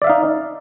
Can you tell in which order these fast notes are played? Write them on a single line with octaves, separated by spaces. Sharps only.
D5 E5 F5 D#4